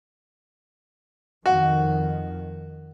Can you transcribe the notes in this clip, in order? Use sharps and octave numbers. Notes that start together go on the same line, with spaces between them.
F2 D#3 F#4